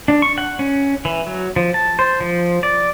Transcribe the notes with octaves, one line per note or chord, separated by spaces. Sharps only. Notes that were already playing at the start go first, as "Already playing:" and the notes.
D4
C#6
F#5
C#4
E3
F#3
F3
A5
C5
F3
D5